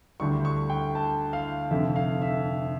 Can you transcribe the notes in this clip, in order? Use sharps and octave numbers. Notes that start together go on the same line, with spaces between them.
D2 D3 G3 C#6
C#6
G5
A5
F5
F1 F2 D3 E5
F5
E5